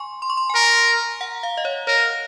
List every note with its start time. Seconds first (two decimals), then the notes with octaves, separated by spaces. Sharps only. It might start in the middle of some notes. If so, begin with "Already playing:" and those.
Already playing: G#5 C6 C#6
0.22 C6
0.30 C#6
0.37 C6
0.50 G#5
0.55 A#4 A#5
0.88 A#5
1.21 F#5
1.43 F5
1.57 D#5
1.65 C#5
1.87 A#4 C#5